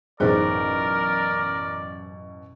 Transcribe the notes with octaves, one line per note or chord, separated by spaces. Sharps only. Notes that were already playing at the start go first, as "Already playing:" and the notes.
A1 F#2 B2 D#4 G#4 A#4 C5 D5